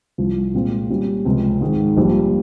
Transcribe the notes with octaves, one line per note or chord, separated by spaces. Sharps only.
C2 C3 F3
A#2 G#3 C4 F4
A#2 G3 C#4
C#2 C3 F3 C4
G#2 D#3 G#3
A#1 A#2 G3